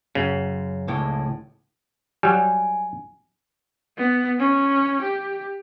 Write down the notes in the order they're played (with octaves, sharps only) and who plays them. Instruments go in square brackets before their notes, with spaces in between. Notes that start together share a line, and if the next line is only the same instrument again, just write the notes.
[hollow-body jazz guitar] F#2 [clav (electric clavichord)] C#3
[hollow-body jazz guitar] C#2 A2
[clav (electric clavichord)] F#3 G3 [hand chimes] G#5
[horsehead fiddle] B3
C#4
G4